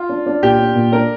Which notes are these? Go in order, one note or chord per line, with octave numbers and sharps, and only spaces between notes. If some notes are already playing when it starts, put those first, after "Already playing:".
Already playing: F4
D4
D4
A#2 G4
D4
A#2
D4 A#4